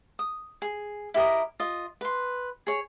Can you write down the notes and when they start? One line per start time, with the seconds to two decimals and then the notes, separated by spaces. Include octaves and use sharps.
0.19 D#6
0.62 G#4
1.14 E4 G4 A#4 D#5
1.60 F4 D#5
2.01 B4 C6
2.67 G#4 C#5